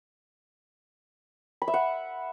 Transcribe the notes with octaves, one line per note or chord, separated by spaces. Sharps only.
B5
E5
F#5